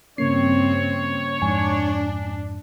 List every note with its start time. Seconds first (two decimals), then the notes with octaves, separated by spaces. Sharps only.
0.18 G2 C#3 A#3 C4 C#4 C#5 C7
1.42 F2 G#2 D4 G#5